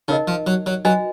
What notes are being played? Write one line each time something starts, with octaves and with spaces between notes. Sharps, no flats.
C#3 D#4 A#4 D#5
F3
F#3
F#3
F#3 F#4 B4 D#5 G#5